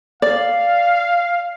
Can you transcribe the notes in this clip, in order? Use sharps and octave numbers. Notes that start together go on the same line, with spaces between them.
D5 F5